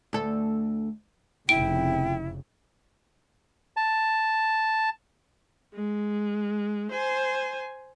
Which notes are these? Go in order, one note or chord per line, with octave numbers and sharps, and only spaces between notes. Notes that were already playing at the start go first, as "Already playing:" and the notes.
D2 A4
F1 F2 C#3 E4 G5 D7
A5
G#3
C5 G#5